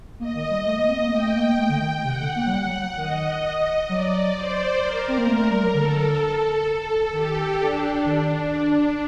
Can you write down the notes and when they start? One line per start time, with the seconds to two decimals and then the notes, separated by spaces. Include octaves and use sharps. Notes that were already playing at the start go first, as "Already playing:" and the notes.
0.19 A#3 D#5
0.35 D#3
0.50 G3
0.66 A3
0.77 A#3
0.88 C4
1.00 A#3
1.12 A3 G5
1.23 A3
1.36 A#3
1.47 A#3
1.58 A3 G5
1.69 D3
1.81 D#3
2.04 C3 F#5
2.20 D3
2.36 A#3
2.46 F#3
2.50 G3 F#5
2.66 F#3
2.81 F#3
2.97 D#3 D#5
3.44 D#5
3.89 F#3 D5
4.35 C5
4.82 A#4
5.08 C4
5.18 A#3
5.27 A3 A#4
5.40 A3
5.50 G3
5.63 F#3
5.74 D3 A4
6.66 A4
7.12 D#3 G4
7.58 D4
8.05 D#3 D4
8.51 D4